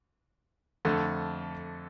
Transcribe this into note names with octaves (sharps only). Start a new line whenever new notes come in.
F2 D3 A3